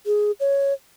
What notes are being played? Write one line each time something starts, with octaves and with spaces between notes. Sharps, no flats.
G#4
C#5